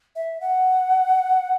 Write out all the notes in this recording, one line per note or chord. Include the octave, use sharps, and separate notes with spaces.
E5
F#5